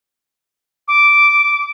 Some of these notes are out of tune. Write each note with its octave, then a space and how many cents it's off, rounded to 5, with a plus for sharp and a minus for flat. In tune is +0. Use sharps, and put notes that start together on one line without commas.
D6 -10